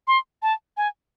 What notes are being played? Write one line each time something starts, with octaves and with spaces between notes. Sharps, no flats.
C6
A5
G#5